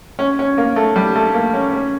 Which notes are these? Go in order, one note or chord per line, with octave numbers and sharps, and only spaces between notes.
C#4
C#4
A#3
A3
G3
A3
A#3
C#4
C#4